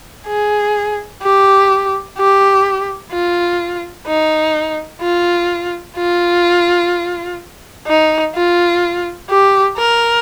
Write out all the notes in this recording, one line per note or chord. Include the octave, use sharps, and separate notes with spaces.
G#4
G4
G4
F4
D#4
F4
F4
D#4
F4
G4
A#4